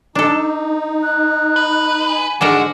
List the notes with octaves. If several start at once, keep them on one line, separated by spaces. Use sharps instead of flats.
D4 D#4 A4
F#6
B4
G#5
G#2 D3 G#3 D4 F#4 A4 A#4